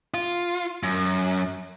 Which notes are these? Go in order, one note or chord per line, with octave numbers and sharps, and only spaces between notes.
F4
F#2